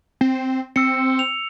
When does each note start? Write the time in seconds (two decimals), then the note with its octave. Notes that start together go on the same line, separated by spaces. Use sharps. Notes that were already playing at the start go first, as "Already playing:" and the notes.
0.21 C4
0.76 C4 E6 C#7
1.19 F7